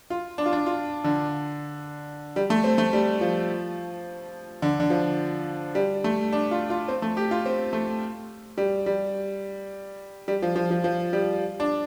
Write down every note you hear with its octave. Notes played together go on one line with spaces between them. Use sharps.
F4
D4
F4
D4
F4
D3
G3
A3
C4
A3
G3
F3
D3
D3
F3
G3
A3
D4
F4
F4
C4
A3
G4
F4
C4
A3
G3
G3
G3
F3
F3
F3
F3
G3
D4